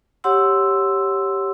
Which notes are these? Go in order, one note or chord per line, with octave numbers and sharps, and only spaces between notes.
G4 C#5 F#5 C6 E6